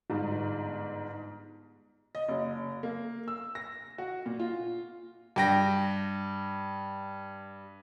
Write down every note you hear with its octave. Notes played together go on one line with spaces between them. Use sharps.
G1 G#2
D#5
F#1
A#3
E6
A#6
F#4
A#2
F4
G2 G5 A#6